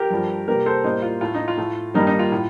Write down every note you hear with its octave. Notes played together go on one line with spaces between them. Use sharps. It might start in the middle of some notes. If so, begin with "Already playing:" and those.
Already playing: G4 A#4
G2 F3 A3
C3 G3 A#3 G4 A#4
A4 C5
A2 G3 A#3 C5 D#5
F4
A2 A3 F4
D#4
F4
A2 A3
G2 D#3 G3 A#3 D#4
D#4
F4
A2